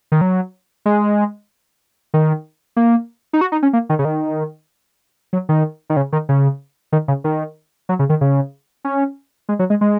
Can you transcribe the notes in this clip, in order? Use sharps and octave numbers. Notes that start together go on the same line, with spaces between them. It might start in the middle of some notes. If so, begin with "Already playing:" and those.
D#3
F#3
G#3
D#3
A#3
D#4
F#4
D#4
C#4
A#3
D#3
C#3
D#3
F#3
D#3
D#3
C#3
D#3
C#3
D#3
C#3
D#3
F#3
C#3
D#3
C#3
C#4
G#3
F#3
G#3
G#3